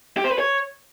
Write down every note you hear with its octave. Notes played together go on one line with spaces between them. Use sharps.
G4
C5
B4
C#5